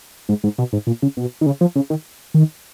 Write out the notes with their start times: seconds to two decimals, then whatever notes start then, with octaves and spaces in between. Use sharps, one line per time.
0.29 G#2
0.44 G#2
0.58 B2
0.73 G#2
0.87 A#2
1.03 C#3
1.17 B2
1.41 D#3
1.46 C#3
1.61 F3
1.76 C#3
1.90 D#3
2.34 D#3